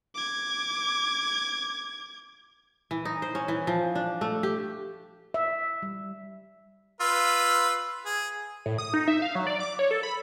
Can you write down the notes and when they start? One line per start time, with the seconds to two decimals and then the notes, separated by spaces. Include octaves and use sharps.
0.15 D6 G#6
2.91 E3
3.05 D#4
3.22 C5
3.35 C#4
3.48 E3
3.67 F3
3.95 D4
4.21 A3
4.43 G4
5.34 E5
5.82 G3
7.01 F4 B4 E6
8.06 G#4
8.66 A2
8.78 D#6
8.94 D#4
9.08 E5
9.22 F5
9.35 F#3
9.47 D5
9.60 D6
9.79 C#5
9.91 A4
10.03 B5